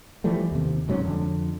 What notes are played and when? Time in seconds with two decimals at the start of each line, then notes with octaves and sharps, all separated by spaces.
0.24 E3 F3 G3 A3
0.51 D#2 C3
0.88 E1 G#2 F#3 C#4
1.02 F2 D3